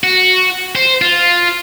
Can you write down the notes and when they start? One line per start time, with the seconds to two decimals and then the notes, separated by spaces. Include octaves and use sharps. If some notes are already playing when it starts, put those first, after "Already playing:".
0.04 F#4
0.75 C5
1.02 F4